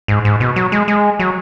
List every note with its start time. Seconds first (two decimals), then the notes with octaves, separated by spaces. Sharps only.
0.08 G#2
0.25 G#2
0.40 B2
0.56 F#3
0.72 G#3
0.88 G#3
1.19 F#3